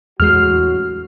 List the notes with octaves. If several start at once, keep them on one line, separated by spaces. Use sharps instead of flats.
A1 E2 F#3 G#3 F#4 F6 C7